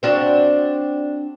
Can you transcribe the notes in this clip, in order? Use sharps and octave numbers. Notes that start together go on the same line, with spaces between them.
C4 D4 F#4